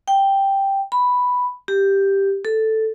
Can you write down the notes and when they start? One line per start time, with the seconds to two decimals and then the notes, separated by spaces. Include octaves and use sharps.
0.08 G5
0.92 B5
1.68 G4
2.45 A4